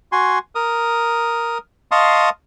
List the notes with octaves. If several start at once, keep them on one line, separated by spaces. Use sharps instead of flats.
F#4 G#5 C6
A#4 D#6
D#5 F5 A5 C6 C#6 D#6